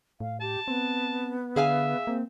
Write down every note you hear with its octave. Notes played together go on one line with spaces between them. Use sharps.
A2 F5
G4 A5
B3 C4
D3 G#4 E5 F5 G#5
A#3 C4